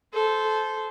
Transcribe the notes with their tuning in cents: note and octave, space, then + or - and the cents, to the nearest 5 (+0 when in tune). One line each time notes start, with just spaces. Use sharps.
A4 -20 C5 -10